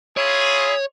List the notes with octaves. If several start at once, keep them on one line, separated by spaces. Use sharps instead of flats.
E4 F4 G#4 C#5